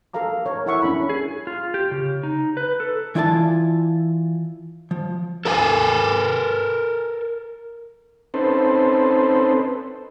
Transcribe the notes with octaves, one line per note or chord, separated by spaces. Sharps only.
A4 A#4 F5 A#5 D6
A#4 C#5
E4 A4 E5 F#5 C#6
C#4 D4 E4 B5
G#4
F4
G4
C#3
D#4
B4
A4
E3 E4 F4 D5 E5 A5
F3
A4 A#4 F5 G#5
C4 C#4 D#4 A4 B4 C5